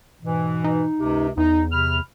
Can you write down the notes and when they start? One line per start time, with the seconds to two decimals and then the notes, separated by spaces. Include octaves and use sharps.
0.22 G#2 B2 E3
0.64 D#4
0.99 C#2 F#2 C3
1.37 E2 D#4
1.72 C3 B5 F6